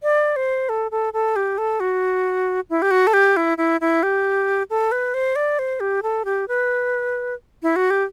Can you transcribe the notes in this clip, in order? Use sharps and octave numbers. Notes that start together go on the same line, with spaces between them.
D5
C5
A4
A4
A4
G4
A4
F#4
E4
G4
F#4
A4
G4
E4
E4
E4
G4
A4
B4
C5
D5
C5
G4
A4
G4
B4
E4
F#4
G4